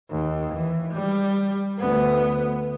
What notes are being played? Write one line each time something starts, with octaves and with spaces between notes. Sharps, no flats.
D#2
E3
G3
D2 B3